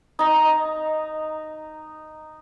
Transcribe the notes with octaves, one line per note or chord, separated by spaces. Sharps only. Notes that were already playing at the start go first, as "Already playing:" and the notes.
D#4 A#5